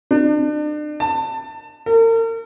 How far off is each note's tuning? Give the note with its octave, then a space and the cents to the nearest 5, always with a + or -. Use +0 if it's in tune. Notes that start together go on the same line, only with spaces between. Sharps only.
D4 +40
A5 +25
A#4 -40